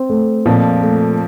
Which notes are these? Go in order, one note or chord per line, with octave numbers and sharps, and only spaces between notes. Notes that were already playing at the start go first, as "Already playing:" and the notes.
Already playing: C4
A3
F2 A#2 F3
A3